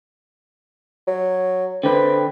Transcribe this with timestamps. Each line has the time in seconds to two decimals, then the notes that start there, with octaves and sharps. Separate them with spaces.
1.08 F#3
1.83 D3 C4 B4